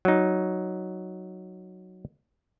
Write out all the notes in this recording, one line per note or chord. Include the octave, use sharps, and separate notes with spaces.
F#3 D#4